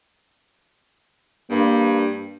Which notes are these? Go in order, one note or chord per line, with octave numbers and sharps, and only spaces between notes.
G2 A#3